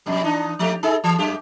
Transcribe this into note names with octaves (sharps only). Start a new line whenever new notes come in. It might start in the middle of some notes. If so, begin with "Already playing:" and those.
F2 B2 G3
E3 D4 D#4
F3 A3 G4
D#4 G#4 A4
E3
F#2 G#3 G4